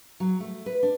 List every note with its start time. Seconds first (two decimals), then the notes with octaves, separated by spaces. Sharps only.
0.20 F#3
0.40 A3
0.66 B4
0.83 D4